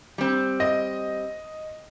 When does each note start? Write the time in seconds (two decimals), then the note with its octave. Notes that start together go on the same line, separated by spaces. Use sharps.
0.18 G3 C4
0.60 D#5